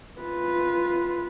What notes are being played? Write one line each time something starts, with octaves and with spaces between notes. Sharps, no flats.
F4 B4